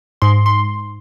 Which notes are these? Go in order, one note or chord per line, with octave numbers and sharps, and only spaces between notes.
G#2 C6
C6